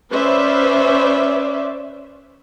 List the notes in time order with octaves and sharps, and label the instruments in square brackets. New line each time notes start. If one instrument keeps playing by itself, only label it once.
[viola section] C#4 B4 C5 D5 E5